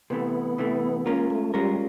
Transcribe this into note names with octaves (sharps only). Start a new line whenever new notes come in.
C3 E3 A3 B3
C3 E3 A3
G#3 A#3 C#4 F4 A#4
A3
G3 G#3 C#4 F4 A#4